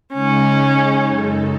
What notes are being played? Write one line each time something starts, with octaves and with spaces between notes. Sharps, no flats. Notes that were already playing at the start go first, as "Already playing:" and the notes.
C#3 G#3 C#4 D#4
F#2 C#3 G#3 D#4 A4